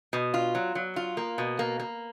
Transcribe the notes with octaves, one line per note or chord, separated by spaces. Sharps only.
B2
F4
F#3
F#3
F4
A#3
B2
A#3
A#3